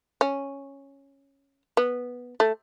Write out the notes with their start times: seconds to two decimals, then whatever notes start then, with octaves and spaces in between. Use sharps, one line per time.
0.21 C#4
1.77 B3
2.40 A3